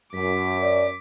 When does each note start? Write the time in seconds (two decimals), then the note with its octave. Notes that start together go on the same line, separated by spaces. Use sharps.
0.14 F#2 D6 B6
0.62 D5